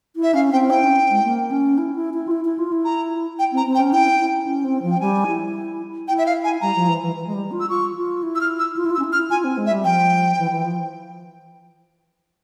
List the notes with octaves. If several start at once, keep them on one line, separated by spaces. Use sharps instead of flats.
E4
E5
C#4 F5
C4 G5
E4 G5
C#4
G#3
A#3
C#4
E4
E4
E4
F4
E4
E4
F4
E4
A#5
G5
C4
A#5
C4
G5
C#4
E4 G5
E4
C#4
C4
F3
G5
G3 G#5
E4
E4 G5
E5
F5
G#5
G3 A#5
F3
E3
E3
E3
G#3
G3
F4
E6
F4 C#6
F4
E4
E6
F6
E6
F4
E4
F4 E6
C#4
E4
F6
E4
F4 G#5
C4
G#3
E5
G3
F3 G5
E3
E3
F3